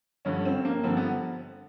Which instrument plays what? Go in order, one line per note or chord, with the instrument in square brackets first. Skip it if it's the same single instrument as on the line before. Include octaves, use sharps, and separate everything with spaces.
[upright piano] G2 D3 F3 C#4
C4
A#3
G2 D3 F3 C4
B3